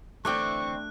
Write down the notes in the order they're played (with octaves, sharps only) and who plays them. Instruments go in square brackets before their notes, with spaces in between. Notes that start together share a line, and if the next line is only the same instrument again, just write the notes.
[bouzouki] D3 E3 C4 [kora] A3 D4 G5 [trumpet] C#6 [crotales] F#6